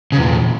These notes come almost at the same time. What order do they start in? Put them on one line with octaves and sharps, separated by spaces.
C#3 E2 A#2